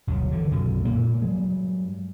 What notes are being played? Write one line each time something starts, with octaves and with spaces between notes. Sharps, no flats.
G1 D2 B2 F#3
D3 E3
B1 F#2 B2 D3
A#2 G#3 A#3
G2 F#3 G#3